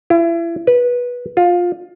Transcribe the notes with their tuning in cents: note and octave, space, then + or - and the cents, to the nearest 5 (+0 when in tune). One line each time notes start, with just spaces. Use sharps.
E4 +35
B4 -15
F4 +15